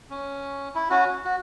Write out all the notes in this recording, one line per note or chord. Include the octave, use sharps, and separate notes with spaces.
C#4
E4
C#4 F#4
F#4